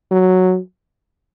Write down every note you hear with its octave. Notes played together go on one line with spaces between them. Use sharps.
F#3